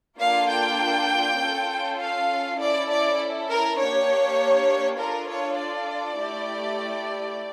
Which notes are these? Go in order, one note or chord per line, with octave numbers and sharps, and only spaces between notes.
A#3 D4 F4 A4 F5
G5
C#4 F4 A4
F5
C#4 E4 A4 D5
D5
A#4
A#3 D4 G4 C#5
D4 F4 A4 A#4
C#5
D5
A3 E4 G4